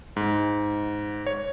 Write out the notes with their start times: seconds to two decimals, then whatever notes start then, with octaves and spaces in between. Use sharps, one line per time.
0.16 G#2
1.26 C#5